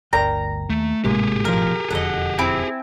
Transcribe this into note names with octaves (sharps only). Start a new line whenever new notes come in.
G1 D2 A#4 D5 G5 A#5
D#2 A3
G#1 A2 C3 G#3 A#3 G4 G#4
B1 F3 A#4
E1 F2 D3 A4 D#5 F#5
C4 E4 G#5